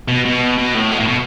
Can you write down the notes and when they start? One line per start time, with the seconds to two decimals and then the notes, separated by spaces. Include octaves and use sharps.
0.08 B2
0.25 B2
0.58 B2
0.74 A2
0.91 B2
1.00 A2
1.07 B2